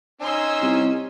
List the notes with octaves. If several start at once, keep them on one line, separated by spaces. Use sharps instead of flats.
C#4 D#4 G#5 C6 E6
C2